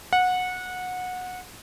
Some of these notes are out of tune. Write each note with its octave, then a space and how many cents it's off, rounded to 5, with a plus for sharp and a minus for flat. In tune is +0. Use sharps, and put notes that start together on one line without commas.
F#5 -20